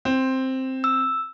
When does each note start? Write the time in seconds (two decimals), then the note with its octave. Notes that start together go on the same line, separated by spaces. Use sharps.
0.05 C4
0.84 E6